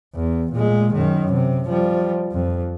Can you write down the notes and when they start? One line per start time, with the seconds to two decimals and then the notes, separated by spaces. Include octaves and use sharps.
0.15 E2
0.53 A#2 G#3
0.94 F#2 D#3
1.32 C3
1.69 F3 G3
2.32 F2